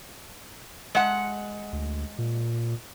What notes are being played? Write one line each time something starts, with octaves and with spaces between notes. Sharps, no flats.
G#3 F#5
D2
A#2